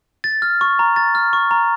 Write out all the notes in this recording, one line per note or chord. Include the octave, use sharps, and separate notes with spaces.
A6
F6
C#6
A#5
A6
F6
C#6
A#5